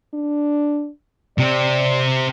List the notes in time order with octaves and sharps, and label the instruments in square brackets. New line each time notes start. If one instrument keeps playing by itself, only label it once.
[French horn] D4
[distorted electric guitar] C3 C4 [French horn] D5